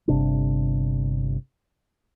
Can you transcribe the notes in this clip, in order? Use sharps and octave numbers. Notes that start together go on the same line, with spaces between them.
G1 C3 D4